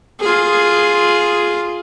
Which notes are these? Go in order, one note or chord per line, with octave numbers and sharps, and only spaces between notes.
F4 G#4